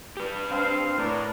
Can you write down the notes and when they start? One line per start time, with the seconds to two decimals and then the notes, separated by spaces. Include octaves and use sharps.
0.17 G4 B4
0.50 C4 D4 C5 F5
0.98 A2 D4 A#4 B4